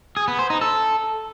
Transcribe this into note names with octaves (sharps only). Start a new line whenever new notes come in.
G#4
B3
C5
D#4
A4